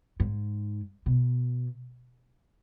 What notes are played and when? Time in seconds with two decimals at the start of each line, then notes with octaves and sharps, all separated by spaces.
0.20 G#2
1.06 B2